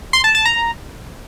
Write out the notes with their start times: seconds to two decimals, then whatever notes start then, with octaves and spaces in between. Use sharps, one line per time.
0.13 C6
0.24 A5
0.35 A5
0.45 A#5